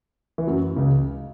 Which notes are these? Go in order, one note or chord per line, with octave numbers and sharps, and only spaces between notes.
E3
F#2 F#3
C#2 C#3